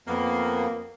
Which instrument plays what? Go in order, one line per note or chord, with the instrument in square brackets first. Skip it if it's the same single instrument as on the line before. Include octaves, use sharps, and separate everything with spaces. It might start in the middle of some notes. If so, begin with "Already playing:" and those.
[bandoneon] F2 B3 [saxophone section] A#3